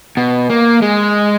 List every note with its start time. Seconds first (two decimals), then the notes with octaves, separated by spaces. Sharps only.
0.17 B2
0.50 A#3
0.82 G#3